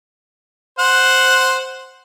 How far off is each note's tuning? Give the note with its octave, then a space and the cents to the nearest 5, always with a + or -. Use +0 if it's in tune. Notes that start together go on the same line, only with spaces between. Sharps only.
C5 +0 F#5 +0